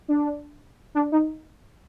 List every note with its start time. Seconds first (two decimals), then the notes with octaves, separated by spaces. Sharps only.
0.08 D4
0.95 D4
1.12 D#4